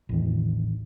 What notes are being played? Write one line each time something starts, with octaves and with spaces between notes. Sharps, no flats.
A1 E2 D#3